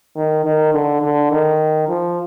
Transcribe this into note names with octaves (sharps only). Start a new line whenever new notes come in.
D#3
D#3
D3
D3
D#3
F3